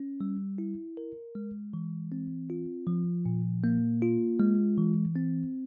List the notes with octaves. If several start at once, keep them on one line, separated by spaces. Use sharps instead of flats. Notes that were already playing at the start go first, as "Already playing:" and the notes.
Already playing: C#4
G3
E4
A#4
G#3
E3
C4
F4
F3
A#2
A#3
F4
G#3
E3
C4